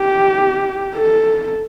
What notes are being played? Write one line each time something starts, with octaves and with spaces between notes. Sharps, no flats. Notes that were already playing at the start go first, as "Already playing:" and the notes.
Already playing: G4
A4